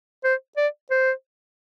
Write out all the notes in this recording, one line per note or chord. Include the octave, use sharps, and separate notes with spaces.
C5
D5
C5